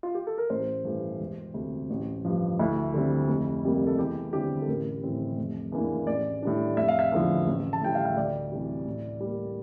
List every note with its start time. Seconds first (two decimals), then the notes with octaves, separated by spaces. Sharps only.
0.03 F4
0.15 G4
0.27 A4
0.38 A#4
0.50 A1 C5
0.85 G2 E3 A3
1.20 E1
1.54 D2 C3
1.90 A1
2.25 G2 F3
2.59 D2 E4
2.94 D3 G3 C4
3.28 F1
3.64 F2 C3 G3 A#3
3.87 A4
3.98 E2 G4
4.33 D3 G3 C4 E4 G4
4.62 A4
4.68 A1 A#4
5.03 A2 E3 G3 C4
5.38 F1
5.72 E2 E3 A#3 D4
6.07 A1 D5
6.42 A2 G3 D4
6.77 F1 E5
6.88 F5
6.99 E5
7.12 E2 D3 F3
7.47 A1
7.73 A5
7.81 A2 G3 G5
7.95 F5
8.05 E5
8.17 D2 D5
8.52 C3 E3 G3
8.86 A2
9.20 G3
9.26 A#3